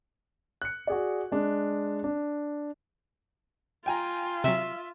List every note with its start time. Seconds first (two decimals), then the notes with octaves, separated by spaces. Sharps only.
0.62 F#6 C#7
0.87 F#4 G#4 D5
1.32 G#3 D4
2.04 D4
3.86 F4 G5 G#5 A#5
4.44 C3 F#3 E5